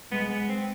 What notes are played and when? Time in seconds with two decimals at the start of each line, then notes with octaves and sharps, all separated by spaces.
0.11 G#3 B3
0.30 B3
0.49 C4